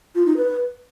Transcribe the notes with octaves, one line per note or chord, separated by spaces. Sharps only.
F4
D#4
B4